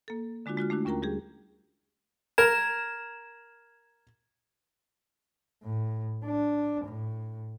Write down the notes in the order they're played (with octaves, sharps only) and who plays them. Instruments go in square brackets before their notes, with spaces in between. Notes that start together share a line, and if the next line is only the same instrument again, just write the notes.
[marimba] A#3 A4
D3 G#3 D4 F4 F#4
G#3 F4 F#4 F6
A3 D4 E4 F#4
D#2 C#4 F4 A#4 G5 A#5
G3 G4 G#4
[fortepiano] A#4 A#5 [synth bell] G#6 E7
[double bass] A2
D4
A2